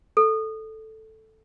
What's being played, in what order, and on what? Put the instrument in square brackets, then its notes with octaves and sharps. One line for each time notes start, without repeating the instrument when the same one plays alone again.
[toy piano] A4